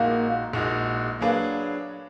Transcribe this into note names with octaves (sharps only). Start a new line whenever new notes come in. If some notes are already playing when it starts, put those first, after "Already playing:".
Already playing: A#1 A#2 G#3 A#3 D#4 F#4
A#1 A#2 G#3 D#4 F#4
F#3 A#3 D4 G#4 B4